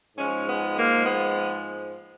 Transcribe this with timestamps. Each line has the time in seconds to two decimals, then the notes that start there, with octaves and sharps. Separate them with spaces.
0.17 G#2 F3 G#3 C#4
0.46 B3
0.77 A#3
1.05 B3